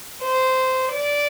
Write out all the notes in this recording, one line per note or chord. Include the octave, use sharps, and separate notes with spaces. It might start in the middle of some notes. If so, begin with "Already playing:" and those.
C5
D5